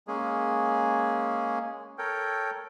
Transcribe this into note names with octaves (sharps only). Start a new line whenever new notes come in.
G#3 A#3 C#4 G#4
A4 A#4 C#5 G5